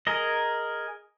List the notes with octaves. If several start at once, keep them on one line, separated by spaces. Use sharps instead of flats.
G#4 A#4 D#5